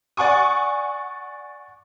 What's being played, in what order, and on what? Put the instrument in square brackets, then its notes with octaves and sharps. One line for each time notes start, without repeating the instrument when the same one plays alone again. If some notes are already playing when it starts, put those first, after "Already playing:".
[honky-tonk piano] D5 F#5 G#5 C#6 D#6